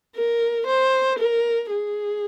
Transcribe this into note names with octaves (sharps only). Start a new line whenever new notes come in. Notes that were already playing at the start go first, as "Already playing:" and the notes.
A#4
C5
A#4
G#4